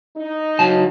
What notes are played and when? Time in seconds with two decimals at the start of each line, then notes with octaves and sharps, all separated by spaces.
0.16 D#4
0.59 F#3 A5